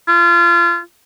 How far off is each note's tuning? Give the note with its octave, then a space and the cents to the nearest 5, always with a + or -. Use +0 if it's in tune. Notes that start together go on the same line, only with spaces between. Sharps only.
F4 -30